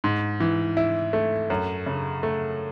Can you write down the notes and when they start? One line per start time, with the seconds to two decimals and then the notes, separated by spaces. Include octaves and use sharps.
0.04 G#2
0.40 E3
0.77 E4
1.13 A3
1.50 F#2
1.86 C#3
2.23 A3